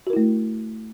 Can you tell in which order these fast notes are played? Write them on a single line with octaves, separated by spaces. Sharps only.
F#4 A#4 E4 A3